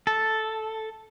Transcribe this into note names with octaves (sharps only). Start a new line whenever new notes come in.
A4